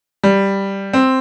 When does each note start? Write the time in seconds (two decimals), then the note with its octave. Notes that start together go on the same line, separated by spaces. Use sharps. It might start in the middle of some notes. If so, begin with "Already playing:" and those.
0.23 G3
0.93 C4